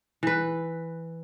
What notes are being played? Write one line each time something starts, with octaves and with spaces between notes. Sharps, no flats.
E3 B4